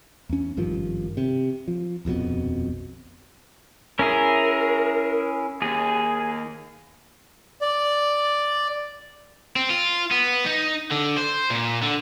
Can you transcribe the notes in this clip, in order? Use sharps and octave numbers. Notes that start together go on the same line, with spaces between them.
E2 C#4
G#1 G2 D#3 F3
C3
F3
D#1 A#1 F2 B2
C#4 E4 G#4 A#4
D#2 G#4
D5
C4
F4
B3
D#4
D3
C5
A#2
D3